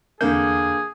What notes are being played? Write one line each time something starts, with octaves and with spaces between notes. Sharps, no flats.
E2 D3 A#3 G#4 G6